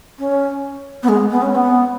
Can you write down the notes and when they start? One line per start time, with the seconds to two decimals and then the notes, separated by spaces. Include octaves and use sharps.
0.18 C#4
1.02 B3
1.08 G#3
1.30 B3
1.42 C#4
1.54 B3